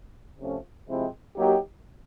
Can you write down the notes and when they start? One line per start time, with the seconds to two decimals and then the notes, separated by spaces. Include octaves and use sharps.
0.39 C3 F3 A3 C#4 F4
0.88 C3 F3 G#3 C4 E4
1.37 F#3 A#3 D#4 G4